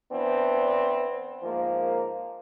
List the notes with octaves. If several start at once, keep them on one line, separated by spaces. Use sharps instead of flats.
E3 B3 C4 D4
G#2 F3 A#3